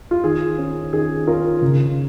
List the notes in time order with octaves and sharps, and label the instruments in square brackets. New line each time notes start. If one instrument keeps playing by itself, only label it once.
[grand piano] F4
D#3 G#4
C#4
D#3 G#4
C#4 F4 A#4
C#3